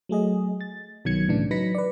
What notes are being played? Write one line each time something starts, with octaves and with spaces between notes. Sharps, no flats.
F#3 A3 G#4 D#5
A6
C2 B2 D#3 F#3 G#6 C#7
A2 C#3 E3 D4
F#3 D#4 B4 A#6 B6 C#7
B4 D5